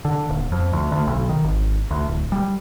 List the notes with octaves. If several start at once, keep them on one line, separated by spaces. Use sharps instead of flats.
D3
D#1
F2
D2
D2
B1
D#3
G#1
D2
D1
G3